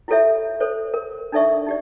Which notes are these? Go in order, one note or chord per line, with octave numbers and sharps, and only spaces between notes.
E4 F4 G4 A4 C#5 E5
A4 C5 C#5
A#4
D4 D#4 A4 D5 E5 C#6
D#4 G4 D5